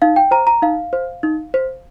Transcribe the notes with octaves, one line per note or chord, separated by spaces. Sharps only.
D#4 F5
G5
C5 A#5
A#5
D#4 F5
C5
D#4
C5